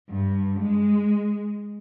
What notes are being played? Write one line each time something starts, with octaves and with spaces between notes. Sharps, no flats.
G2
G#3